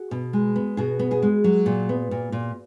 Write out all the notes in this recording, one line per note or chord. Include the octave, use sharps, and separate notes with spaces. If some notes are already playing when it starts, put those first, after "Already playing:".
Already playing: F#4 G#4
B2
G#3
B3
B2 F#4 G#4
B3
F#4 G#4
G#3
F#3
A#2
B3
A#2
A#2